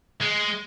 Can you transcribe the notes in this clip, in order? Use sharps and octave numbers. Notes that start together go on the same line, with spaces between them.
G#3